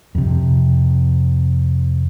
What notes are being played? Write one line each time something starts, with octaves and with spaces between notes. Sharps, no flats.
F2 C3